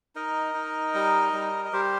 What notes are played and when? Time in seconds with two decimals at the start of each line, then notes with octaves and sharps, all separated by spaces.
0.15 D#4 A#4 D#5
0.54 D#4
0.94 G3
1.33 G3
1.65 D#5
1.73 G3 G4 C5